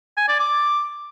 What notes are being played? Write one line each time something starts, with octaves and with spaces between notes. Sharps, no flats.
G#5
D5
D6